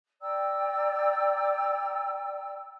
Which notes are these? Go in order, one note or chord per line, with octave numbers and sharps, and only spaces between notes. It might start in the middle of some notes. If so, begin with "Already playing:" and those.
D5 G5 A#5 E6